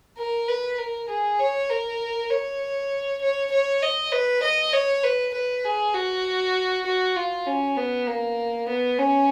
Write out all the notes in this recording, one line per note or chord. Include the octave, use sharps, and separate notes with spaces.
A#4
B4
A#4
G#4
C#5
A#4
C#5
C#5
C#5
D#5
B4
D#5
C#5
B4
B4
G#4
F#4
F#4
F4
C#4
B3
A#3
B3
C#4